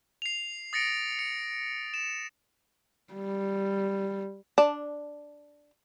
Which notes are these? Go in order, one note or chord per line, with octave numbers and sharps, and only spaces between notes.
C7 F7
D#6 A6 A#6 C#7 D7
C#7
E7
G3
D4